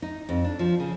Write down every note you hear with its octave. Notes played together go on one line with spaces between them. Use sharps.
D#4
F2
D4
F3
C#3